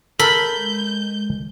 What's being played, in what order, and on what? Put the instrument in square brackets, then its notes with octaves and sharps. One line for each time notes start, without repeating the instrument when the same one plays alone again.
[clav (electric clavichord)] A4 A#4 [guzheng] B5 [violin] G6
[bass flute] G#3